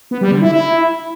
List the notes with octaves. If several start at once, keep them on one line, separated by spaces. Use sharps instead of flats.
B3
G3
D3
E4
E4